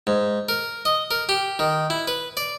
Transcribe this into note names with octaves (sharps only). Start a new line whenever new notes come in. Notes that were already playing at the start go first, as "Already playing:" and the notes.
G#2
A#4
D#5
A#4
G4
D#3
E4
B4
D5